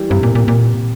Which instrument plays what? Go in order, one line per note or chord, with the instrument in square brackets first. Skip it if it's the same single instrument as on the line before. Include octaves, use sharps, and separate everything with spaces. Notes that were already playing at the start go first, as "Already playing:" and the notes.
Already playing: [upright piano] E3 G3
[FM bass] G2 [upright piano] C3
[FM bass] A#2
A#2
A#2